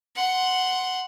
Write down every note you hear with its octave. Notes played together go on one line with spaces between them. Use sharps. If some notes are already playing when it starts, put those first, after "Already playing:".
F#5 C6